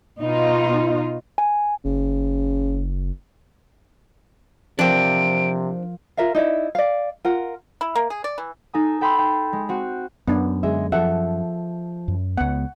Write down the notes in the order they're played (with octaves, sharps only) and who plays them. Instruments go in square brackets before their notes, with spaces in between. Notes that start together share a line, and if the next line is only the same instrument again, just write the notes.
[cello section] B2 D#4 F4
[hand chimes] G#5
[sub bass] F#1 [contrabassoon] C#3
[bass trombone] C3 [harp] F3 A#4 [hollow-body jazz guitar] C4 D4 [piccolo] D7
[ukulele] F4 A#4 E5 F5
D#4 E4 D5 E5
D5 F5
F4 A#4 F#5
[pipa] E4
A#3
G#4
D5
E3
[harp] D#4 A4 G#5 D#6
A4 G5 B5 C6 E6
G5
G#3
C4 F#4
[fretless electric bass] F#2 [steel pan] B3 D4
[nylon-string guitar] D3 G#3 E5
[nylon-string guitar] F3 A4 E5 [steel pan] F#5
[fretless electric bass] F#2
[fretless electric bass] C#2 B3 [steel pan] F#5